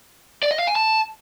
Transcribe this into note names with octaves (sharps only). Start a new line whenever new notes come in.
D5
D#5
F5
G#5
A5